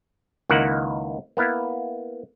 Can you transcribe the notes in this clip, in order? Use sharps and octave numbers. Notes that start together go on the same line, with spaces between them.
C#2 D#3 A#3 E4 F#5
A#3 B3 E4 F5